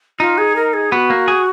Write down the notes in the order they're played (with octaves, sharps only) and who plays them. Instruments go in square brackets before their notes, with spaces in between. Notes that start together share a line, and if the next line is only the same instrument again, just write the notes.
[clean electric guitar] D#4 [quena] F4
[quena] G#4
A#4
G#4
[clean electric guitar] B3 [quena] F#4
[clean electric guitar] A#3
G#4